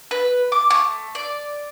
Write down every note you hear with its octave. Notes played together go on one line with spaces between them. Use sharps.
B4
D6
A3
D5